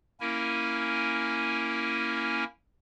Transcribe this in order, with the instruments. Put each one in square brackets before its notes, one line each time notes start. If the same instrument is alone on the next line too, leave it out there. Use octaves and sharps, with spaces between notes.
[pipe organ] A#3 C#4 E4 A#4 G#5